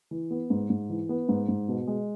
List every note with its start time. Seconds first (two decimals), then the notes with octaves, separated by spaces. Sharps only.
0.11 E3
0.31 B3
0.50 G#2
0.70 G#2
0.90 E3
1.09 B3
1.29 G#2
1.48 G#2
1.68 B2
1.87 G#3